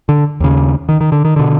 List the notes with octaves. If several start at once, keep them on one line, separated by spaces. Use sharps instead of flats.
D3
D#2 C#3
D#3
D#3
D3
D#3
B2 D3